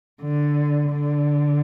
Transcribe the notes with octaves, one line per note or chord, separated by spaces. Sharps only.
D3
D3